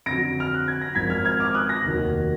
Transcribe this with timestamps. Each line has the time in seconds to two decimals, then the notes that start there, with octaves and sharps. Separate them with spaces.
0.06 F2 D3 F#3 A#6 D7
0.40 F6
0.54 F#6
0.68 G#6
0.82 A#6
0.95 G#1 G#2 F3 G#6 B6
1.10 F6 G#6
1.25 F6 G#6
1.40 D6 F6
1.54 D#6 F#6
1.69 F#6 A#6
1.84 F1 D#2 D#3 F#3